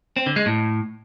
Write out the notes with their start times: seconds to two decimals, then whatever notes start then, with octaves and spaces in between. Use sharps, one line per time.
0.16 C4
0.26 D3
0.36 G#3
0.46 A2